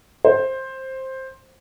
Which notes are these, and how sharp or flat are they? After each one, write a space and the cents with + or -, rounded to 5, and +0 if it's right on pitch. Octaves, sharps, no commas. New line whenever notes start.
C5 +10